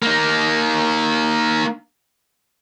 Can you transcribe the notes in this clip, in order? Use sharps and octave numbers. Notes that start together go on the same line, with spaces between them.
A#3 D#4